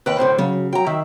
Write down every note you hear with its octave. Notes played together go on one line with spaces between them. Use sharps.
D#2 B4 G5 F#6
F#2 A2 D3 C5
C#3 F#3
F#3 G5 A#5
D#3 E5